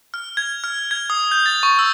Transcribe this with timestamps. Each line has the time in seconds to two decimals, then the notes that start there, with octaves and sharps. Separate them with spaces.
0.14 F6
0.37 G#6
0.64 F6
0.91 G#6
1.10 D#6
1.31 G6
1.46 A6
1.63 C#6
1.79 E6